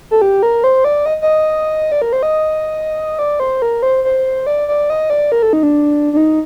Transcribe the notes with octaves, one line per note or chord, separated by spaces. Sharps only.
A4
G4
A#4
C5
D5
D#5
D#5
D5
A#4
C5
D#5
D5
C5
A#4
C5
C5
D5
D5
D#5
D5
A#4
A4
D#4
D4
D4
D#4